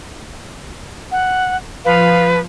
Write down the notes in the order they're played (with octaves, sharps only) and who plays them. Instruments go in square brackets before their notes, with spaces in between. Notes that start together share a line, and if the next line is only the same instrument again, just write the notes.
[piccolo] F#5
[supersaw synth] F3 [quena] B4 [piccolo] F5